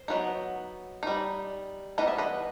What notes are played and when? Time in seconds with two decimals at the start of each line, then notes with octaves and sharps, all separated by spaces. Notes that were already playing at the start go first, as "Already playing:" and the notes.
Already playing: C5
0.08 F#3 B3 D#4
1.03 G3 D#4
1.98 E3 G3 B3 D#4 D#5
2.08 E5
2.18 B4 D#5